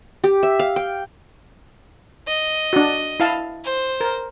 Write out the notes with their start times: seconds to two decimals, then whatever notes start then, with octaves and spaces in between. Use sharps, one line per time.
0.24 G4
0.43 E5
0.59 F5
0.76 G5
2.28 D#5
2.73 D4 F#4
3.20 E4 F5 A5
3.65 C5
4.01 A#4